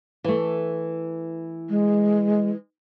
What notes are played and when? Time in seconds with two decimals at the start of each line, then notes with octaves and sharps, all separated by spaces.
0.24 E3 A3
1.69 G#3